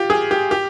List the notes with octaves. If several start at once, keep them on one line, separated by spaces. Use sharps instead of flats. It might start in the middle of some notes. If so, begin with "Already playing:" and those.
Already playing: F4 G4
G#4
G4
G4